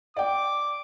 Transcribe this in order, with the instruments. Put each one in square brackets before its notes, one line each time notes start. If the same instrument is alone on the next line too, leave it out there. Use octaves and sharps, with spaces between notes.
[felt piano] D5 G5 [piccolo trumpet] D6